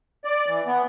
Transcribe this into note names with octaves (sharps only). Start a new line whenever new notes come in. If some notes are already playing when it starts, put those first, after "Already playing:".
D5
E3
B3